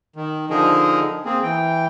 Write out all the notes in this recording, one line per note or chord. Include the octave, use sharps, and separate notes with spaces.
D#3
D3 F3 D#4 G#4 A#4
A#3 C4 G#4
E3 G5